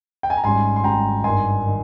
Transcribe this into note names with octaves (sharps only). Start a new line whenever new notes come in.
G5
G#5
A#5
G#1 G#2 G3 C#4 G#5 C6
C6
G#1 G#2 G3 C#4 G5 A#5
G#1 G2 D#3 G#5 C6
D#3